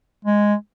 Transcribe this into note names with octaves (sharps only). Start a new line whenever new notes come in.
G#3